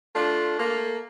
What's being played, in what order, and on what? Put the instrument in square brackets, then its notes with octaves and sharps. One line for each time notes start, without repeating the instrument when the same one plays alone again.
[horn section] A3 D4 F4
A3 A#3